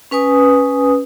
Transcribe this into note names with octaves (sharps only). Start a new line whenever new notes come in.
C#4 B4 G#5 D#6